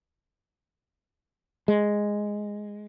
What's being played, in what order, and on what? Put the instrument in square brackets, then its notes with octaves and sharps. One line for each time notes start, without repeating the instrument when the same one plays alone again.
[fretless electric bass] G#3